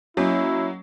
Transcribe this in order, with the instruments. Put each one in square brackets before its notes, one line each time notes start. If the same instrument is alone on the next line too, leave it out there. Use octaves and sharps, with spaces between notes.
[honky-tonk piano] F#3 [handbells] A#3 C#4 D#5 [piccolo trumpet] E4